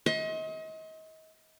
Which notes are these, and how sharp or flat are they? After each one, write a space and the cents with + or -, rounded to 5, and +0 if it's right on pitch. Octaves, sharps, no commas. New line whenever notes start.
D#5 +35 C6 +35